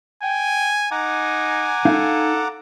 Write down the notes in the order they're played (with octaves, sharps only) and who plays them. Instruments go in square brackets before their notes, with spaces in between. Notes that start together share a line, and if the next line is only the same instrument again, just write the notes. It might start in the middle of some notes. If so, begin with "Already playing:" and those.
[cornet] G5 [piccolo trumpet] G#5
[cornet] D#4 [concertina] F#5 A#5 D6 [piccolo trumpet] G#5
[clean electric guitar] D#4 F5 [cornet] A4